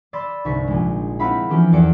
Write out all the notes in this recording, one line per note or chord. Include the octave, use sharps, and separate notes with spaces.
D5 B5 C6 E6 A6
G1 C2 D#4 C#6 B6
A#1 G#3
C4 D#4 E4 F5 F#5 B5
E3 F3 C4 C#4 G4 A#4
E2 A4 D5 C#7 D7